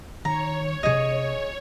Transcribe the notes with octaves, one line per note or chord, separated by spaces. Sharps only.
D#3 C#5 A#5
C3 D4 G#4 D#5